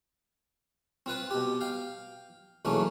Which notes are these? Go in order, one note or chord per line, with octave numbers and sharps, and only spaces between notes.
C4 F4 B4
B2 G4
F5 G5
B1 E2 A3 A#3 C#4